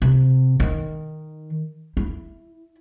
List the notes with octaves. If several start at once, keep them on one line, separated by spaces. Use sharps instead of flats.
C3
D#3
E4